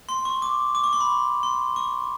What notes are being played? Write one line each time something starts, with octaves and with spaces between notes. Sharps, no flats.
C6
C#6
D6
D6
C#6
C6
B5
C6
C#6